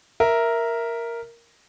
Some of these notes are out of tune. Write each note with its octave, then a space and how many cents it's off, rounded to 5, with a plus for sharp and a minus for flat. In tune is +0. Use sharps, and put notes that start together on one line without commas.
A#4 +0 E5 +0